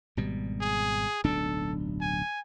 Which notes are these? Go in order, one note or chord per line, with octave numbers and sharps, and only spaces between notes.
G#1 B2 G3
G#4
D1 B1 D4 A4
G#5